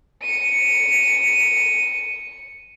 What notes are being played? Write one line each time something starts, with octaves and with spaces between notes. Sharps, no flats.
C#7 D#7